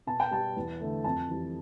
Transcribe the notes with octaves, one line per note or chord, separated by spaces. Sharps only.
B2 A5
G5
G3 A5
E2
D3 A3
F2 A5
E3 G3